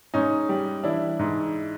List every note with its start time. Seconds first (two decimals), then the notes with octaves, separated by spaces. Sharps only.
0.14 G#2 C#4 D#4
0.49 G3
0.84 E3 D4 E4
1.19 G#2